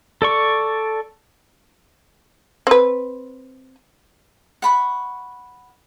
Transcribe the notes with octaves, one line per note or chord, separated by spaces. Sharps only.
A4 D5 C#6
C4 B4
F#5 B5 C#6